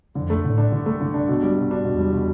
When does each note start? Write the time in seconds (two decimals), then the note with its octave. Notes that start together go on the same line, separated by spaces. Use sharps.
0.15 F2 D3
0.30 A3
0.44 A2 D3
0.58 D4
0.72 G2 D3
0.86 A3
1.01 D3
1.14 D4
1.28 B2
1.43 G3
1.57 B2
1.71 D4
1.85 E2 B2
1.99 G3
2.13 B2